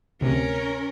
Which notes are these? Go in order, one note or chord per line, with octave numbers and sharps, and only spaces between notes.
D2 C3 C#4 A#4